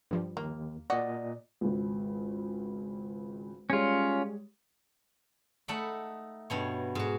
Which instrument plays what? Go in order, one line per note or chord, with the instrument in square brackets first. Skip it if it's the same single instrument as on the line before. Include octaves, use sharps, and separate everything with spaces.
[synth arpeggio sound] G2 F3 G3
[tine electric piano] D#2 [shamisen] A#3
[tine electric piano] A#2 D#5 [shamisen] F#4 [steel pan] D5
[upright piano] G#1 C#2
[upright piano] G3 G#3 C#5 [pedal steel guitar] C#4 F4
[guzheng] A3 D#4 A4 E5 F#5 B5
G2 B2 C#5
G#2 F#4